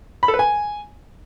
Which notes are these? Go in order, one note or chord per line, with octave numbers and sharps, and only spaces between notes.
B5
A4
B4
G#5